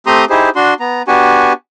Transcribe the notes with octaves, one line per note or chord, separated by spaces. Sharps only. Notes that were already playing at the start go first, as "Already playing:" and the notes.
A3 C4 G4 A#5 C6 D#6
D#4 E4 G4 G#4 C5
D4 F#4 C6
B3 A#5
B3 D4 F#4 G4 G#5 C#6